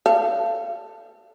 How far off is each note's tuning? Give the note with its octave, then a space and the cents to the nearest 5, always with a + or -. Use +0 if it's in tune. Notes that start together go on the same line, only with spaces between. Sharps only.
A4 +0 F5 -30